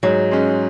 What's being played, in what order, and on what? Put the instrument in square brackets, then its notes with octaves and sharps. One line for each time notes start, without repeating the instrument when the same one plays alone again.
[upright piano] G#2 [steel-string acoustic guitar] F#3
[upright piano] G#3 C#4